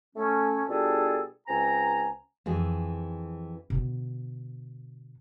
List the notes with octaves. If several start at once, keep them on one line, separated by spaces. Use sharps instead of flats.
A3 C#4
B2 G3 D4 F4 G#4 A4
C#2 C4 G#5 A#5
F2 E3 G#4
B2 D3